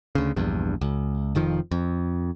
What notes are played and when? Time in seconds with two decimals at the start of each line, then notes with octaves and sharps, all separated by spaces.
0.15 D2 C#3
0.36 A#1 E2 G2
0.81 C#2
1.35 F1 F2 D#3 F3
1.71 F2